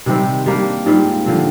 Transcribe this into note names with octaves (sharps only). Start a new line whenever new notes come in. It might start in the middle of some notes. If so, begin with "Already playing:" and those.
C3 D#3 G3 C4
G3 A#3 D4
G#2 G3 C4 F4
D3 F3 C4